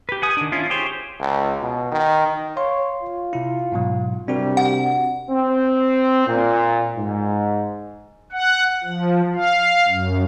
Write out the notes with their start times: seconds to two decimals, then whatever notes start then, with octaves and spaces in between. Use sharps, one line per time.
0.09 G4 B4
0.22 F#5 G#5 D#6
0.37 D#3 D4
0.52 C#4 E4 F4
0.70 G4 G#4 C5 C#5
1.20 C#2
1.62 B2
1.92 D#3
2.57 C#5 F5 C6
3.02 F4
3.33 C3 E4
3.72 G#2 B2 F#3
4.28 C3 G3 D4 F#4 A#4
4.57 F#5
5.30 C4
6.28 A#2
6.97 G#2
8.32 F#5
8.84 F3
9.35 F5
9.88 F#2